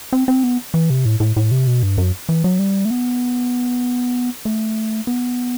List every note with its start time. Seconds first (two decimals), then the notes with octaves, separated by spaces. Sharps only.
0.13 C4
0.28 C4
0.44 B3
0.74 E3
0.90 C3
1.05 A2
1.20 A2
1.36 A2
1.51 C3
1.67 B2
1.83 G2
1.98 F#2
2.29 E3
2.44 F#3
2.59 G3
2.85 A3
2.91 B3
4.45 A3
5.07 B3